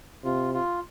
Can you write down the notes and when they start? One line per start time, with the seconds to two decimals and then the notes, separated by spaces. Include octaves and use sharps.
0.24 C3 F4
0.54 F4